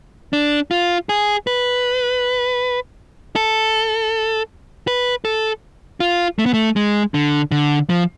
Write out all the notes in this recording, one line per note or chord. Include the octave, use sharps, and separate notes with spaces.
D4
F4
G#4
B4
A4
B4
A4
F4
A3
B3
A3
G#3
D3
D3
F3